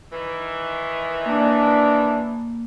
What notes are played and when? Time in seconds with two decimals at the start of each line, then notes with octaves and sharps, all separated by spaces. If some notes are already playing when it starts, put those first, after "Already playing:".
0.12 D#3 E3
1.26 A#3 D4